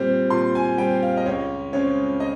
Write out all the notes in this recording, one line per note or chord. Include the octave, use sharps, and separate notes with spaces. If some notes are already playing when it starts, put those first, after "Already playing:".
Already playing: A#2 G3 C4
A#2 C6
G#5
G3 C4 G5
F5
D#5
C#2 C#5
C#3 G#3 C4 C#5
D#5